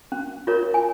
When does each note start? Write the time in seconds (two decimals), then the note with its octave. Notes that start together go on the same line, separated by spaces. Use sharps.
0.12 C#4
0.47 F4 A#4 C#5
0.74 G#5